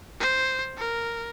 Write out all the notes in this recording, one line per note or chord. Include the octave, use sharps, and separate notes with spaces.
C5
A#4